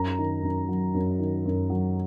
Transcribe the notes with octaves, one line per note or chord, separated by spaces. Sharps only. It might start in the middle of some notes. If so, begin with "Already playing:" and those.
Already playing: F#2 A#5
D#3
F#2
F#3
F#2
D#3
F#2
F#3